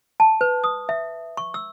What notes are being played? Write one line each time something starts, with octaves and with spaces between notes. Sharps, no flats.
A5
B4
D#6
E5
C#6
E6